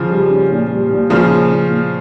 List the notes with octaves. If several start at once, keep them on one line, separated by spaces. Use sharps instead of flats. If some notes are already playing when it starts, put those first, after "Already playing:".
Already playing: C#3 F3
G3
C#4
A#2
G3
A#2
A#2 C#3 F3
C#4
A#2
A#2